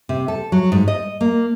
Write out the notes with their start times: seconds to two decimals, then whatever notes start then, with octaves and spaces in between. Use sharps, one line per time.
0.09 C3
0.28 A4
0.52 F#3
0.72 G#2
0.88 D#5
1.21 A#3